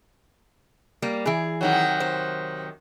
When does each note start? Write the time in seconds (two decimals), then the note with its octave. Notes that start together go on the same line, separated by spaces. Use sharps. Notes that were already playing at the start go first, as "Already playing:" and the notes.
1.02 G3 A#3
1.26 E3 G#4
1.61 C3 D#3 F#3
2.00 C5